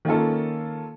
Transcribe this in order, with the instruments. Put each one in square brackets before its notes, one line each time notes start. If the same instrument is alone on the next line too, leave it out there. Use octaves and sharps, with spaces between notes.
[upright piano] D#3 A#3 C#4 F4 A4